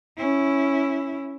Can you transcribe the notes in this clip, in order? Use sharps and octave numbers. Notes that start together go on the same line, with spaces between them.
C#4 E4